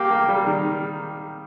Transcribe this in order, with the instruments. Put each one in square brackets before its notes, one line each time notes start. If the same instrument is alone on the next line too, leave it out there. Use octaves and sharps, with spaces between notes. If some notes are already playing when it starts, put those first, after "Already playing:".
Already playing: [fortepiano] A#3 [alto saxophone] G4
[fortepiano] A#3
G3
D#3